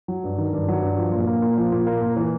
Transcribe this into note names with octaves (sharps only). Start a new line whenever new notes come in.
F#3
G2
D#3
G2
F#3
G2
F3
A#2
A#3
A#2
F3
A#2
A#3
A#2
E3